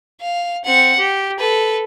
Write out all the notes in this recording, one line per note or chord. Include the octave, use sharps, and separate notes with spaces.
F5
C4 F#5
G4
A4 B4